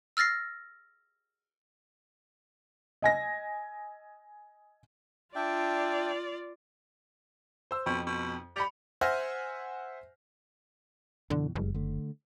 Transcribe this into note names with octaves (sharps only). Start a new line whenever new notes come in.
E6 F6 A6 A#6 C7
D#5 G#5 A#6
D4 F4 D5 E5 G5
C5 E6
F2 B2
B2
G3 B5 C#7 F7
C5 E5 F#5 G#5 F6 A#6
F#2 B2 D3 E3
F#1 F2 G3 G#3
D3 A3